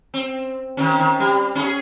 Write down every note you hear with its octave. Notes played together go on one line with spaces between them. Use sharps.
C4
D#3 C4 C#4
D#3
G3
C#4 D#4 G#4